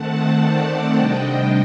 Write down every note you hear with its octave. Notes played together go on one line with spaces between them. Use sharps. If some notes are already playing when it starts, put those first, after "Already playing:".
Already playing: D#3 A3 C4 F#5 A5
D5 F#5
C3 G3 D4 D#5 G5